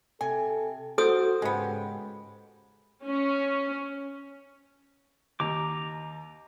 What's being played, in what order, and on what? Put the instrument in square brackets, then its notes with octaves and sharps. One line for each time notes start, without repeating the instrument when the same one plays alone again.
[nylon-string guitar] C3 [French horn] A4 [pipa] G#5
[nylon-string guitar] D#4 [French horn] F#4 [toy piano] A4 D#6 [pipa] C5
[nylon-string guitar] G#2 G4 [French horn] C#3 [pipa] G#3 B3
[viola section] C#4
[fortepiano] D#2 [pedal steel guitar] A#5 D6